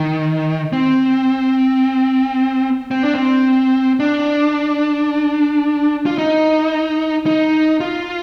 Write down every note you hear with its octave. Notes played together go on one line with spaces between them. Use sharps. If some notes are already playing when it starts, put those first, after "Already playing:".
Already playing: D#3
C4
C4
D4
C4
D4
F4
D#4
D#4
F4